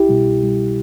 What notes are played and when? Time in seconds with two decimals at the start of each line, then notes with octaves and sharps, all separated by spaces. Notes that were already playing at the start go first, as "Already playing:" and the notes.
Already playing: C2 E4 G4
0.09 B2 G3
0.26 C2
0.42 B2 G3